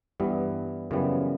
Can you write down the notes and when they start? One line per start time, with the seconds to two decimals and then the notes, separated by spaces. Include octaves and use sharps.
0.20 G2 E3 G3 B3
0.91 F#2 C#3 E3 G3 B3